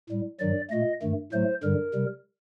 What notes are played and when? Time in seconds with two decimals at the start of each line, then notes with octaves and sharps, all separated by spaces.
0.10 A2 G3
0.40 G2 D#3 F#3 D5
0.70 A#2 A3 D#5
1.02 G2 D#3 A3
1.33 A2 F#3 A3 C5
1.63 G2 D3 G3 A#4
1.94 C3 G3